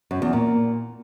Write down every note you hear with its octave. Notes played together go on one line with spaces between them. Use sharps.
F#2
E2
A#2